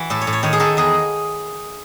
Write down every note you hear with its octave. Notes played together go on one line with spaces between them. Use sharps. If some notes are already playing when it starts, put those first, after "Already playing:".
Already playing: E3 F#4
A2 A4
C#5
A2
C#5
D#3 C#5
G#4
D#3 A4
E2 G#4